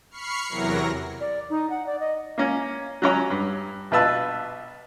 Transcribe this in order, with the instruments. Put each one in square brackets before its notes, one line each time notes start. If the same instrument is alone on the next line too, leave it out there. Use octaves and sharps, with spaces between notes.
[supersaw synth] B5 C#6 F6 C7 C#7
E2 C3 E3 F#3 A#4 A#6
[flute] D5
D#4
F#5
D5
D#5
[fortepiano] A#3 C#4
F#3 C#4 C#5 A#5
G2
A#1 B2 F4 B4 A5 E6